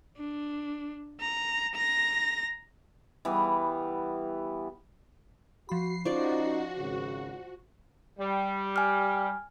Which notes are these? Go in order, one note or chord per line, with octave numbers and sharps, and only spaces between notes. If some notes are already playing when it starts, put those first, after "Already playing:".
D4
A#5
A#5 A#6
E3 G3 B3
F3 F#4 B5 C7
F3 C#4 D#4 F#4 D5 C#6
G#1 C#3
G3
G#5 F6